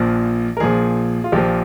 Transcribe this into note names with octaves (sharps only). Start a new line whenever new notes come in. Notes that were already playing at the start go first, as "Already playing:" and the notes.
Already playing: A#1 A#2 F3
A#4
A#1 A#2 F3 G#4
F4
A#1 A#2 F3 G4